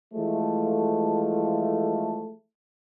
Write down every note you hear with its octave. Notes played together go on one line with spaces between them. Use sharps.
E3 F3 G#3 A3